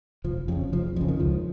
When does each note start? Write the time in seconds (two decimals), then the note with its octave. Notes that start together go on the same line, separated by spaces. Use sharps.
0.24 F1 F3
0.48 F2 F3
0.52 C#3
0.73 F1 F3
0.96 F2 C#3 F3
1.08 D#3
1.19 C#2 F3